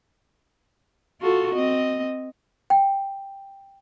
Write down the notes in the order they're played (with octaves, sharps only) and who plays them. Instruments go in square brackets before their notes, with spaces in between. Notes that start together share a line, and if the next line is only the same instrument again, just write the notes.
[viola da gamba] F4 F#4 A4
C4 D#5
[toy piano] G5